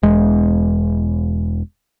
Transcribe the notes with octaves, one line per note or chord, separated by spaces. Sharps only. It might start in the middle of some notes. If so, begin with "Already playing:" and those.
E1 G#3